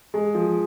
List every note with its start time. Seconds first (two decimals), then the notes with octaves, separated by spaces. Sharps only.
0.14 G#3
0.34 F3